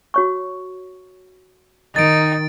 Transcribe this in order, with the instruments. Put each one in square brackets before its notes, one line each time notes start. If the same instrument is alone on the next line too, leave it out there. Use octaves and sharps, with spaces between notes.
[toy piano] F#4 C#5 C#6
[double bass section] D#3 [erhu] D#4 [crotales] A6 D7